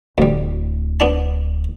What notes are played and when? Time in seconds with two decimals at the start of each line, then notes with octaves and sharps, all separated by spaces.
0.18 D1 D2 G3
1.00 B3 D4 A5